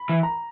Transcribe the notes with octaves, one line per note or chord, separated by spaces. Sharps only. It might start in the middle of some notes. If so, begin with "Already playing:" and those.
Already playing: B5
E3
A#5